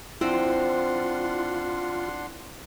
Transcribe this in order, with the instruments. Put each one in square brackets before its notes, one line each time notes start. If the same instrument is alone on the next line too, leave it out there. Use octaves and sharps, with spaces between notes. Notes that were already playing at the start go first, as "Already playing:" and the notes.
[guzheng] F3 C4 [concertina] D4 F#5 C6 [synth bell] E4 [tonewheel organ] F4